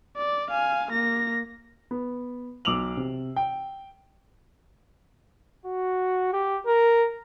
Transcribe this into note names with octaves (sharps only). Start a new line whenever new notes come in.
D5
F5 G#5
A#3 A#6
B3
B1 D6 E6 F7 F#7
C3
G5
F#4
G4
A#4